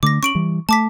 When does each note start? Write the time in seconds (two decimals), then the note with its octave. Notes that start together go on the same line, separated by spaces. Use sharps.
0.03 D3 A3 D6 A#6
0.23 C#4 C#6 D7 F#7
0.35 E3 G3
0.69 A3 A5 D6 B6